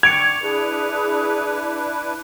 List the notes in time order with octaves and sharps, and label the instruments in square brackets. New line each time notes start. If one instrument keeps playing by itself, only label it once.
[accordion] D3 C#6 D6 [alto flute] G5 [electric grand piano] G#6 [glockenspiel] C#7 D7 F7
[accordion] D4 E4 B4 [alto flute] G#4